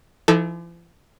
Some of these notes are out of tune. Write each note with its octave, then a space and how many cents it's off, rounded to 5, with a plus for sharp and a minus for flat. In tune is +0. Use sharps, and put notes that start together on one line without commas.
F3 -45 D#4 +45 A4 +0